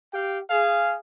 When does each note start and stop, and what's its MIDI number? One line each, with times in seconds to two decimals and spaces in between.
0.14 0.40 67
0.14 0.40 77
0.14 0.40 79
0.50 0.97 68
0.50 0.97 77